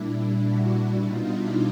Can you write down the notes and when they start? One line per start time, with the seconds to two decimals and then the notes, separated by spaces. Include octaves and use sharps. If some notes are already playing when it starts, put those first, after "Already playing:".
Already playing: A#2 G3 D4 E4
0.46 E4 F#4
1.04 B2 G3 D#4 F4
1.33 D4 E4